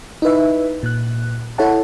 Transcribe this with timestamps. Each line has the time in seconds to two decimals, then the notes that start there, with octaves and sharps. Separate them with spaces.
0.22 D#4 E4 B4 E5
0.83 A#2 F#6
1.58 E4 A4 C#5 F#5 A5